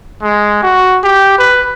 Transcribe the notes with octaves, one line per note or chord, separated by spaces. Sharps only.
G#3
F#4
G4
B4